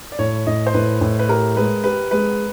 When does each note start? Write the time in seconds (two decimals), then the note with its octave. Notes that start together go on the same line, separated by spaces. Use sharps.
0.12 D5
0.19 A2 C#5
0.47 A2 D#5
0.67 C5
0.74 A2 B4
1.01 A2
1.19 B4
1.28 G4 A#4
1.56 G#3 B4
1.84 G4 B4
2.11 G#3 B4